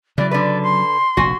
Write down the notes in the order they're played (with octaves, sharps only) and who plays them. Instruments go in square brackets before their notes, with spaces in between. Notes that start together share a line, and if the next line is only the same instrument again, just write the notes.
[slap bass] C#3 F#3 [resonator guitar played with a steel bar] E3 [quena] D5
[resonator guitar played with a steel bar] D3 B4 [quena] D5
[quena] C6
[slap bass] F1 A#1 [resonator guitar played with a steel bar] F#4 G#5